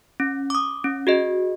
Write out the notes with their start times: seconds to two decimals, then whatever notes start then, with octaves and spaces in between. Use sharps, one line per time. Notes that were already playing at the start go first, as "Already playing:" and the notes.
0.20 C#4
0.50 D6 D#6
0.84 C#4
1.07 F#4 G#4 D#5